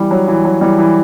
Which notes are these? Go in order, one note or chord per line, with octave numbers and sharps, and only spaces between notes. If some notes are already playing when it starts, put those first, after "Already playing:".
Already playing: E3 G3
F#3
E3
F#3
E3 G3
E3